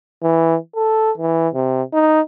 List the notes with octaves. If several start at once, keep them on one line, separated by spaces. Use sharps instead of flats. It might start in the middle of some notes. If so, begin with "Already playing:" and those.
E3
A4
E3
C3
D#4